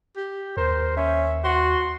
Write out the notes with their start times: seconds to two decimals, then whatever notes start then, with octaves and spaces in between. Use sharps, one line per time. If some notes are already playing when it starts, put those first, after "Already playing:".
0.16 G4
0.57 D#2 A#4 C5
0.97 C#4 E5
1.44 F#4 C6